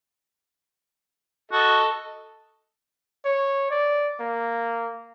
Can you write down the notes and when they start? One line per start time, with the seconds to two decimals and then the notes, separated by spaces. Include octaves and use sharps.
1.52 F#4 A4 D#5
3.25 C#5
3.70 D5
4.20 A#3